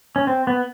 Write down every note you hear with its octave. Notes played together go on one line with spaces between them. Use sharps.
C#4
C4
B3